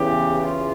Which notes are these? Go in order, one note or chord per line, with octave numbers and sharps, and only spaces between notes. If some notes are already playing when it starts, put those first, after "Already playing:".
Already playing: E2 C#3 E3 G4
F4